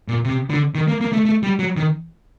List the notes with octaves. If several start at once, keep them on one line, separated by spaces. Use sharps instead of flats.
A#2
C3
D3
D#3
A#3
A#3
A3
A3
G3
F#3
D#3